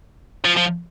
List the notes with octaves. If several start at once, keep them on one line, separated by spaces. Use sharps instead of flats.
F3
F3